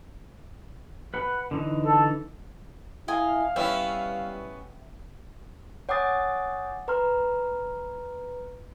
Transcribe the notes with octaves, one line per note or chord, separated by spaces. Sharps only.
B4 F#5 B5
D3 E3 D#4
A4
E4 D#5 F5 G#5
G3 B3 C#4 E4 E5 G5
C#5 F#5 G#5 D6 D#6 A6
B4 A#5 C6 F6